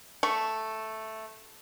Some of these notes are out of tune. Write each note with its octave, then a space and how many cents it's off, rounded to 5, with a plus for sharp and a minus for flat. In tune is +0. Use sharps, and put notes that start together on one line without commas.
A3 +0 C#6 +0